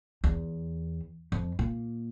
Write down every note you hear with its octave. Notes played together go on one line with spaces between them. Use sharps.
E2
F2
A#2